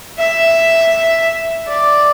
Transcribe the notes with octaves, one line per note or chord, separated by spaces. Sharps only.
E5
D5